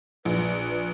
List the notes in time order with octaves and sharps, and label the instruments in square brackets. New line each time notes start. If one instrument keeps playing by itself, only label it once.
[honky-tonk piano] A#1 [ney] B4